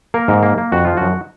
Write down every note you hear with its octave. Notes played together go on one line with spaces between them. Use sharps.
A#3 A#4
G#2
A#3
A#3
F2 F#4
F3 F4
F#2 F#4